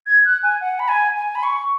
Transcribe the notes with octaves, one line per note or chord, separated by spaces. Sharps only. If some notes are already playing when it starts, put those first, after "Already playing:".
G#6
F#6
G#5
F#5
B5
G#5
G#5
B5
C#6